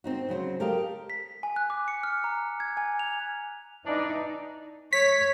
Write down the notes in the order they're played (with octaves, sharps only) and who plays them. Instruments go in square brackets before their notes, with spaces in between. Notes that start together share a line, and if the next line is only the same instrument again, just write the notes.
[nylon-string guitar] C4 D#4 F#4
C#3 F#3 F#4 C5
G4 A4 A#4 D#5 F5 G5
[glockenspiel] B6
G#5
F#6
D6
C#7
F6
A#5
G#6
G#5
F7
[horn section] E3 D4 D5 [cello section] D#4
[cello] C#5 [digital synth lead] B6